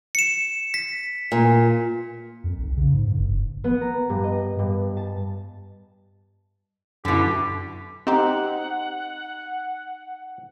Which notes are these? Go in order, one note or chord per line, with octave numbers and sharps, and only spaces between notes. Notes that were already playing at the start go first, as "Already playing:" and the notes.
C#7 E7
B6
A#2
F2
B1
C#3
G#2
G2
F#1
B3
A#5
G2
D#5
G2
A5
F#2 B2 D3 E4 G4
C4 D#4 G4 F#5